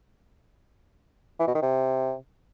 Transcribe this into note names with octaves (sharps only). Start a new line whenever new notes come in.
E3
B2
D#3
C3